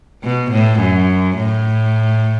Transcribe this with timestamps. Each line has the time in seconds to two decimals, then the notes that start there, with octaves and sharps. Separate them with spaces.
0.24 B2
0.52 A2
0.80 F#2
1.38 A2